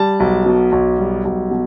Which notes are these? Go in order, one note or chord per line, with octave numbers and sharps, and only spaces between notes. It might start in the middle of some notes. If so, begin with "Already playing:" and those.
Already playing: G3 A5
B1
B2
B1
G3
B1
B2